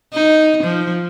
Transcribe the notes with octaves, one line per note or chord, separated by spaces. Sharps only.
D#4
F3